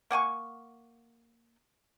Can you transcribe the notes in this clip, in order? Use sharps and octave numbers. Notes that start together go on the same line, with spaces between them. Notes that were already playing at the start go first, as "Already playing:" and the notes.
A#3 F#5 G#5 C#6